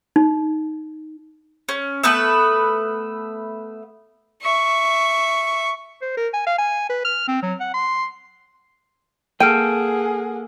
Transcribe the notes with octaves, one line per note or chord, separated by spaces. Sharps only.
D#4
C#4
A3 B3 B4 E5
E5 C#6
C5
A#4
G#5
F5
G#5
B4
F6
C4
F#3
F#5
C6
A#3 G#4 A4 F#5 G5 F6 D7 D#7